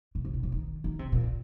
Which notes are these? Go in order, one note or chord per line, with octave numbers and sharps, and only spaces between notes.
A#2
C3
A#2
C3
D#3
D#3
C3
A#2